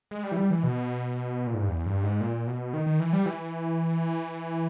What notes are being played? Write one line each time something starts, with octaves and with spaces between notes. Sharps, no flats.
G#3
G3
E3
G3
E3
B2
A#2
G#2
G2
E2
G2
G#2
A#2
B2
D#3
D#3
E3
G3
E3